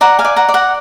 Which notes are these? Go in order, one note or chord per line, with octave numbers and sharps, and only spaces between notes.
D5 F#5 A#5
F5 G#5
D5
F#5 A#5
D5
F#5 A#5